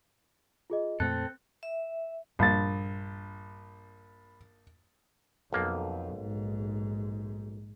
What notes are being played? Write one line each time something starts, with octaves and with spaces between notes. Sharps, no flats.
F4 G#4 D#5
F2 A#2 A3 C4 A4 F#6
E5
A#1 G2 G3 D4 B5 A6
B1 F2 A#3
A#1 G#2